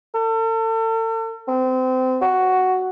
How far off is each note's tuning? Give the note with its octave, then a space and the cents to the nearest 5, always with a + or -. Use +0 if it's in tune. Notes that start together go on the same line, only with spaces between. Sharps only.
A4 +40
C4 -25
F#4 +5